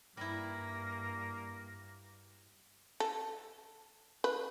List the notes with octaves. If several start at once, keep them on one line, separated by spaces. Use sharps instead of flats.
G2 G3 A#3 E4 A#6
A4
B4